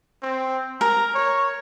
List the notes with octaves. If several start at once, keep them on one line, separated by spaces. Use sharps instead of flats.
C4
A#4 A#5
C#5